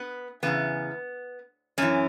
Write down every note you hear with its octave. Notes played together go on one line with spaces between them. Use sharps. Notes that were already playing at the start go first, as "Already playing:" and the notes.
Already playing: B3
E2 C#3 E3 B3
F#2 E3 C#4